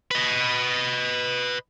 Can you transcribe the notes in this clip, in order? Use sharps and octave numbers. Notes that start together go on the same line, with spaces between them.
B4 D#5